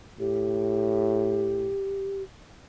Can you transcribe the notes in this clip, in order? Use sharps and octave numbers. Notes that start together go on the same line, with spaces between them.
A2 G4